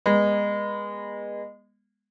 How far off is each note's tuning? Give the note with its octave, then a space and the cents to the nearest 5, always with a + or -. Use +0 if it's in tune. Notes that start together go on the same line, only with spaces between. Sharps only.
G#3 -25 B3 -35